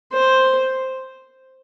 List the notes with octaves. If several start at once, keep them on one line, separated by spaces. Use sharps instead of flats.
C5